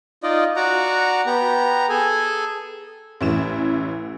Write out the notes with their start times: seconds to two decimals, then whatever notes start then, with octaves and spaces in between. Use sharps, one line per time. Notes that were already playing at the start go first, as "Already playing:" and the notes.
0.23 D#4 F4 D5 D#5
0.56 F#4 D5 F#5 A#5
1.26 B3 G4 A#5
1.89 G#4 A4 G#5
3.21 A1 E3 E7